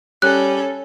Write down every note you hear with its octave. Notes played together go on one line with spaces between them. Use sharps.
G3 C#4 A4 F#6